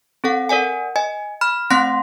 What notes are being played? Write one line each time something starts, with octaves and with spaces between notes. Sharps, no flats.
C4 A4 F#5
A#4 D5 F#5 G#5
D#5 G#5
B5 F6
A3 C4 F#5 C6 A#6